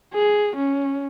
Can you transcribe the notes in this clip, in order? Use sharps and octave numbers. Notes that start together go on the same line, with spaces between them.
G#4
C#4